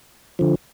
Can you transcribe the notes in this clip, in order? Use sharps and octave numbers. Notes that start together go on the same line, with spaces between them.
D3 F3